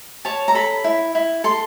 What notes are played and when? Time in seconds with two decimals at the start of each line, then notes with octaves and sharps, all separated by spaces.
0.25 C#5 A5
0.48 A#5
0.55 A4 B5
0.84 E4
1.15 E4
1.44 A4 C6